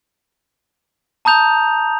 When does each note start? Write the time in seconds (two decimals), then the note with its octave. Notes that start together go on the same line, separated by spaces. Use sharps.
1.25 A5 A#5 D#6 G6 F7